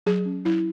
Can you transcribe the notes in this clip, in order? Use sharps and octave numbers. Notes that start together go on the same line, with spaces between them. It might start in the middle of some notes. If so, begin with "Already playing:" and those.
F#3 G#4
C#4
F#3 E4